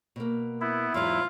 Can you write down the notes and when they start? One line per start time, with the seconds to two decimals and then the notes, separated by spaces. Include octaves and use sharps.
0.16 B2 A#3
0.61 B3 E4
0.94 E2 G#2 F#3 F4